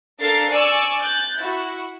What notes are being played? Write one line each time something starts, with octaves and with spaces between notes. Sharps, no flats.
D4 A4 A#4 F5 A6 C7
D5 G#5 C#6 D6 E6
F#6 G6 A6
E4 F#4